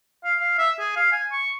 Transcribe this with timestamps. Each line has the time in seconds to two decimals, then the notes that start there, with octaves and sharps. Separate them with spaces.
0.24 F5
0.39 F5
0.58 E5
0.79 G#4
0.96 F5
1.12 G#5
1.32 C#6